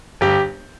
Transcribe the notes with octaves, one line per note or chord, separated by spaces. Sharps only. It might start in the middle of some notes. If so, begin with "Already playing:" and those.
G1 G4